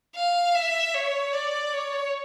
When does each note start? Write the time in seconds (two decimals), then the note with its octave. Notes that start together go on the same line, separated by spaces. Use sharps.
0.15 F5
0.55 E5
0.94 C#5
1.33 D5
1.73 C#5